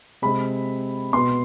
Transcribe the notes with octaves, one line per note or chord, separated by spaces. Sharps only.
C3 G#3 C4 B5
B2 B3 C6